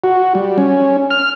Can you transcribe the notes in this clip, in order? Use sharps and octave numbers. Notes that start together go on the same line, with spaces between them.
F#4
G3
C#4
F6